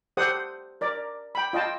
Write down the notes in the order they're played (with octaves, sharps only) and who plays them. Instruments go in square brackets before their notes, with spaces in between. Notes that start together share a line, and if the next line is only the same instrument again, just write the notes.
[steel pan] G4 A4 C5 F#5 D#6
A#4 D5
G5 B5
F4 D#5 G5 A5